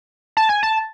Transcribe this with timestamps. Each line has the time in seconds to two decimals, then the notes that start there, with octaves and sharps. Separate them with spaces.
0.37 A5
0.49 G#5
0.63 A5